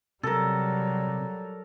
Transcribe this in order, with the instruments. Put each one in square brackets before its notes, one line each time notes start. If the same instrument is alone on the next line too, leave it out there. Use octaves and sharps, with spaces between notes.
[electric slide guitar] C3 [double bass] F#3 G3 [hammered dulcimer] A4 A#4